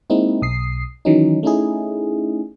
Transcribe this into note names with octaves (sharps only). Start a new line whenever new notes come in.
G#3 A#3 C4 D#4 E4
B1 D#6 C7
D#3 E3 F#3 C#4 D#4
A3 C#4 D#4 E4 G#4